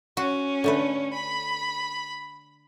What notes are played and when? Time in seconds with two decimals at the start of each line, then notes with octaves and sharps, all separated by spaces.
0.17 C#4 F#4
0.64 D3 A3 B4
1.13 B5